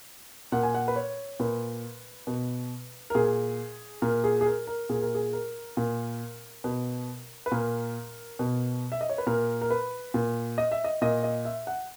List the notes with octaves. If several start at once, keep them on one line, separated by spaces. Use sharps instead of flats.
A#2 F#5
G#5
F#5
B4
C#5
A#2 B4
B2
A#4
A#2 G#4
A#2 A#4
G#4
G#4
A#4
A#4
A#2 G#4
A#4
G#4
A#4
A#2
B2
B4
A#2 A#4
B2
E5
D#5
C#5
B4
A#2 A#4
A#4
B4
A#2
D#5
E5
D#5
A#2 D#5
D#5
E5
F#5